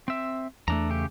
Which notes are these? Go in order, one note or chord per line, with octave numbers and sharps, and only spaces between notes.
C4 E5
E2 A3 D4 A#5
C#3 G4